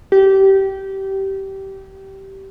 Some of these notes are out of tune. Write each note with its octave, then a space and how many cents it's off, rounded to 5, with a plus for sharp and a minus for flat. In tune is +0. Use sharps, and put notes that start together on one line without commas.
G4 -20